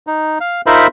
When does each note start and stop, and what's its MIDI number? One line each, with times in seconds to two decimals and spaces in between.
0.07 0.38 63
0.40 0.61 77
0.66 0.87 63
0.66 0.87 65
0.66 0.87 70
0.66 0.87 72
0.66 0.87 76
0.66 0.87 83